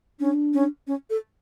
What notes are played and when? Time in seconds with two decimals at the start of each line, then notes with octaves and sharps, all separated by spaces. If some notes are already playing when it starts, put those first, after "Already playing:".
0.20 C#4 D4
0.54 C#4
0.87 C#4
1.10 A4